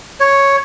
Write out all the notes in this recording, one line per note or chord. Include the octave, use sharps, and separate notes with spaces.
C#5